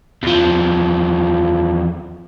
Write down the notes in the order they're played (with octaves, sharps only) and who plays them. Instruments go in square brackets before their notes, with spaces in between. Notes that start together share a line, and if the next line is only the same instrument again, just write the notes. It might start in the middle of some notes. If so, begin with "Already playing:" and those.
[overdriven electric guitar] E2 F3